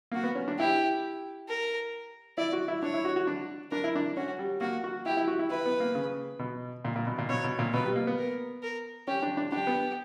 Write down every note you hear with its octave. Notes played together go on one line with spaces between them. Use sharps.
A#3 F#4
B3
C#4
D4
E4 G4
A#4
E4 D5
F#4
E4
D4 C#5
E4
F#4
F#4
D4
D4 A#4
E4
D4
C#4 F#4
G3
A#3 F#4
F#4
E4 G4
E4
F#4
E4
E4 B4
B3
A#3
C#3
B2
A#2
A#2
B2
A#2
B2 C#5
B2
A#2
B2 B4
G3
A#3
B3
A#4
A#4
C#4 G4
D4
D4
D4 G4
B3